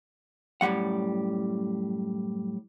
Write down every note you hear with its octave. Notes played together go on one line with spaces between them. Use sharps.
F#2 A2 G3 A3 F#5